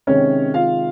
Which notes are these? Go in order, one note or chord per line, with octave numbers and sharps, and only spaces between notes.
C3 D#3 G#3 C#4 C#5
F4 F5